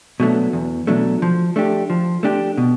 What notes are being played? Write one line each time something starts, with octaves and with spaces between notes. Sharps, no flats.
B2 F#3 A3 D4
E2
B2 F#3 A3 D4
F3
A3 D4 G4
F3
A3 D4 G4
B2